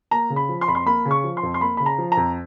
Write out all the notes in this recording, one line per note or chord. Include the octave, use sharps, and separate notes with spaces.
A#3 A#5
C#3
B5
F3
C6
F2 B5
C6
A#3 B5
C#3
C#6
F3
C6
F2
C6
A#3 B5
C#3 B5
A#5
F3
A#5
F2